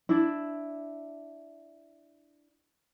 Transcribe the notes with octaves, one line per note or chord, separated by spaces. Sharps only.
D4 E4